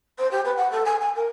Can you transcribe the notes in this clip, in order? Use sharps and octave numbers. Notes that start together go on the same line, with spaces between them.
C5
G4
B4
F#5
A4
G#5
G#5
A#4